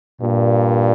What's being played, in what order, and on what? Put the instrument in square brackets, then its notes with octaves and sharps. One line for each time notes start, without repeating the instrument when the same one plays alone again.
[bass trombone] G2 [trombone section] A#2